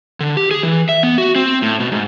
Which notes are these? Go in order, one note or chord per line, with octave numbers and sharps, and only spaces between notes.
D3
G4
G#4
E3
E5
B3
F#4
C4
A2
B2
G#2